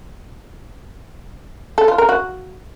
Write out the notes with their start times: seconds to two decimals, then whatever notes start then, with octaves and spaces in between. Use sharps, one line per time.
1.78 A4
1.88 F4
1.98 A#4
2.09 F#4